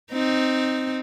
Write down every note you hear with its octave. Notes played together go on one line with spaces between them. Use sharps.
C4 D#4